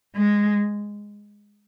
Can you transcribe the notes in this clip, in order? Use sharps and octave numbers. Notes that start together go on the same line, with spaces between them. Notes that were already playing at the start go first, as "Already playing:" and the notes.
G#3